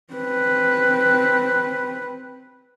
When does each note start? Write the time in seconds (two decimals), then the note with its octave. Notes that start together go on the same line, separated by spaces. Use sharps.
0.13 C4 B4